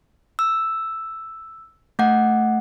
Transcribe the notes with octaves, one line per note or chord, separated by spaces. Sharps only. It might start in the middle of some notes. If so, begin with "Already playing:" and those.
E6
A3 F#5